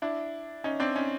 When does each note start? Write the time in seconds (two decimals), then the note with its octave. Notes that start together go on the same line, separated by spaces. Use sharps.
0.02 D4 E4
0.64 C#4 D#4
0.80 C4 D4
0.96 C#4 D#4